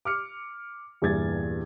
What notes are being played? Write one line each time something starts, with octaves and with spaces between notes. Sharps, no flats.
D6 F6 C#7
E2 G2 A#2 G#6 A6